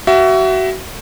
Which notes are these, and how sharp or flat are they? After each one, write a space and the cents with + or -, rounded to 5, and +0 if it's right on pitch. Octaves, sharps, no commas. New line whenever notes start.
F#4 +30 E5 +20